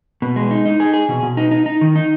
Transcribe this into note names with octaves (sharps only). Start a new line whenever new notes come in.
B2
G#3
D#4
D#4
G#4
G#4
B2
B2
D#4
D#4
D#4
D#3
D#4